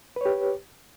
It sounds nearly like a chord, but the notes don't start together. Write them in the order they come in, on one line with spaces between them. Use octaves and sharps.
B4 C#5 G4